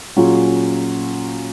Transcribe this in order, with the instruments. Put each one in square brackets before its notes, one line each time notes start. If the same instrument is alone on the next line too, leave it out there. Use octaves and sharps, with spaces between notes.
[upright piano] A#2 F#3 C#4 F4 G#4